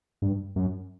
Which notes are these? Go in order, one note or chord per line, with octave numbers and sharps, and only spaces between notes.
G2
F#2